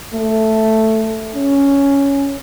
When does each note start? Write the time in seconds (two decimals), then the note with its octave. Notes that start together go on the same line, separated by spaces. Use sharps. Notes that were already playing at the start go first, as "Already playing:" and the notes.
0.14 A3
1.35 C#4